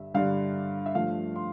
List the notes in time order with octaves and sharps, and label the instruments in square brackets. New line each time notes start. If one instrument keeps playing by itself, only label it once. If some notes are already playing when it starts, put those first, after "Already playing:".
Already playing: [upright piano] G2 D3 G3 E5
G2 D3 G3 F5
E5
G2 F3 A3 F5
C6